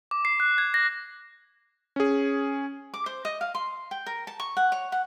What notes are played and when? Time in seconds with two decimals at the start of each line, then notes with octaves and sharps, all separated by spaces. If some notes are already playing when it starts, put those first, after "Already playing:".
0.11 D6
0.25 C7
0.40 F#6
0.58 G#6
0.74 A#6
1.96 C#4 G#4
2.94 D6
3.06 C5
3.25 D#5
3.41 F5
3.55 C6
3.91 G5
4.06 A#4
4.27 A5
4.40 C#6
4.57 F#5
4.72 C#5
4.92 F#5